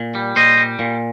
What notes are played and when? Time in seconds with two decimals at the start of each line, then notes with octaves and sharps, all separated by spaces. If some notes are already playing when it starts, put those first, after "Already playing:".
Already playing: A#2
0.15 G3
0.36 A#2 C5 D#5
0.57 G3
0.79 A#2